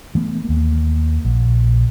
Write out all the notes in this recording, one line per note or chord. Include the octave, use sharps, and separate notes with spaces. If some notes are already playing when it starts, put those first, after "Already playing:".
E3 A3 B3
D#2 A#3
A#1